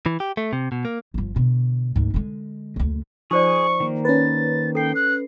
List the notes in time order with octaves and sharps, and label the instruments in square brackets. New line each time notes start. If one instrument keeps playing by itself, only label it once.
[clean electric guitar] E3
G4
A3
C3
B2
A#3
[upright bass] G1 F3
B2 D3
D2 G#2
D3 G#3
F#1 D2
[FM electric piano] F3 [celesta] D#4 C5 D5 [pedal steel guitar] G#4 D#6 [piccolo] C#6
[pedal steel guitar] D#3 A#3
[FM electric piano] C#4 B4 [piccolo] A6
[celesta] A4 C7 [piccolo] G5
[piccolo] F#6